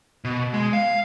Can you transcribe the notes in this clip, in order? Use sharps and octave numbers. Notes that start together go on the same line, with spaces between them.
B2
G#3
F5